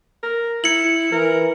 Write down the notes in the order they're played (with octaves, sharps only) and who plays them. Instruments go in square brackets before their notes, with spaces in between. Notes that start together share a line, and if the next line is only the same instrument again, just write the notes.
[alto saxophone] A#4
[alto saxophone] E4 [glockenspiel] C#7 F#7
[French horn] E3 [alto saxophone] A#4